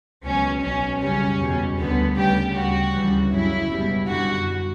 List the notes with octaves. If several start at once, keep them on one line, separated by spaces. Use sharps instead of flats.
C#2 B2 F#3 C#4
B1 B2 F#3 C#4
F#2 C#3 G3 C#4
E2 B2 G3
D2 D3 G3 B3
D2 C#3 G3 G4
D2 C#3 G3 F#4
D2 C#3 E3 G3
G1 F#2 C#3 F#3 E4
C#2 B2 G3
F#2 D3 G3 F#4